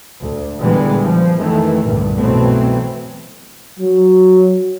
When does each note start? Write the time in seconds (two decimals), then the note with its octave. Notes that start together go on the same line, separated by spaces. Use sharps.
0.21 D2
0.59 A#2 D3 E3 G3 G#3 B3
1.04 F3
1.38 F2 D#3 E3 A3
1.85 C2 G2 A#2 D3
2.17 B2 E3 F#3 A3 C4
3.79 F#3